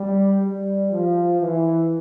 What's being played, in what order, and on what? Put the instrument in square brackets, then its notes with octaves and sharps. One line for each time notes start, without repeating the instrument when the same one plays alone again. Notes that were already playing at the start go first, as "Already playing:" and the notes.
Already playing: [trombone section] G3
G3
F3
E3